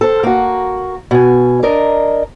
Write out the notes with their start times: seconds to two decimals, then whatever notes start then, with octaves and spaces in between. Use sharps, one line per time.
0.01 A4 C5
0.23 A#3 F#4
1.11 B2 G#5
1.63 D4 A#4 D#5